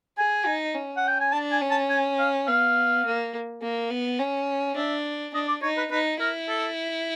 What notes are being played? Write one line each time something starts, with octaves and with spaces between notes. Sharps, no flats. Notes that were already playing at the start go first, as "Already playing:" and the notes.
G#4 G#5
D#4
C#4
F#5
G5
G#5
D4 A5
G#5
C#4
A5
G#5
F5
B3 F5
A#3
A#3
B3
C#4
D4 E5
D4 D#5
D5
D#4 C#5
B4
D#4 B4
E4 A#4
A4